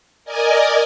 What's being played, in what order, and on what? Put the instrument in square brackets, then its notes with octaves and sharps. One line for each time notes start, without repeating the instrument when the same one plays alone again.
[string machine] A#4 D5 D#5 G#5